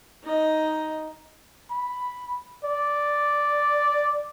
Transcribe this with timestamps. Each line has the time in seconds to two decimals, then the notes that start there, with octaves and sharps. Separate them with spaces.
0.23 D#4 D#5
1.71 B5
2.64 D5